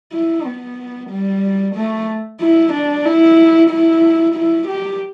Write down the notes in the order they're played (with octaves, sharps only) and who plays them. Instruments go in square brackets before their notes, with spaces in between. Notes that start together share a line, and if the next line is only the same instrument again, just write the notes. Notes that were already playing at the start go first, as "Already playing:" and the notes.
[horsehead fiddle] E4
B3
G3
A3
E4
D4
E4
E4
E4
G4